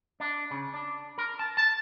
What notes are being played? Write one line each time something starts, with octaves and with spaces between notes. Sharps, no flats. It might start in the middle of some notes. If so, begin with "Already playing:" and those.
D4
C#3
D4
A#4
A5
A5